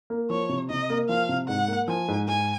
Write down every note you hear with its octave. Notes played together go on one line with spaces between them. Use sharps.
A#3
F3 C#5
C3
C3 D#5
A#3
F3 F5
C3
G#2 F#5
A#3
F3 G#5
G#2
G#2 G#5